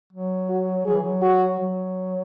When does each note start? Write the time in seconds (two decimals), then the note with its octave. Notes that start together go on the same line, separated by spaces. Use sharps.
0.13 F#3
0.49 F#4
0.86 F#3 G#4
0.93 E3
1.03 F#3
1.22 F#4
1.59 F#3